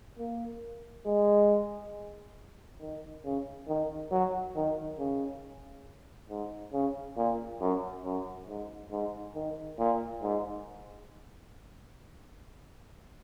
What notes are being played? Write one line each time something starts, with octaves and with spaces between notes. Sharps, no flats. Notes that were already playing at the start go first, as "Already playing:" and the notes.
A#3
G#3
D#3
C#3
D#3
F#3
D#3
C#3
G#2
C#3
A#2
F#2
F#2
G#2
G#2
D#3
A#2
G#2